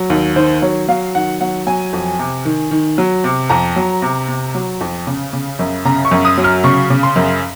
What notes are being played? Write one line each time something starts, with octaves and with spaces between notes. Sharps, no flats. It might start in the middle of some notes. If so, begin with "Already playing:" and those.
Already playing: F#3
D#2
D#3 C5
F#3 C#5
F#3 F5
D#3 F#5
F#3 F#5
F#3 G#5
F2
C3
D#3
D#3
F#3
C3
F2 A#5
F#3
C3
C3
F#3
F2
C#3
C#3
F#2
C#3 A#5
C#6
F#2
D#6
F#3
F6
C#3 C#6
C#3
C6
F#2